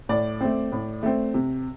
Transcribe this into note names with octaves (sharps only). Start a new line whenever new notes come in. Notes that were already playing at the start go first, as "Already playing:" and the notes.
A2 D5
A3 C4
A2
A3 C4
C3